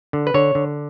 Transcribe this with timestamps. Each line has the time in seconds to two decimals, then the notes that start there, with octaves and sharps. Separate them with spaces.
0.13 D3
0.27 B4
0.34 D3 C#5
0.55 D3